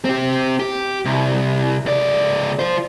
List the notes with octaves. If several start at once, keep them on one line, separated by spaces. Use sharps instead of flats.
C4 G4
G4
C2
C#2 D5
F4 C5